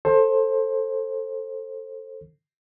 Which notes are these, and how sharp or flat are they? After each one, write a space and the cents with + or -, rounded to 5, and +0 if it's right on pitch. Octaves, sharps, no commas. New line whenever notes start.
A4 +15 C5 +20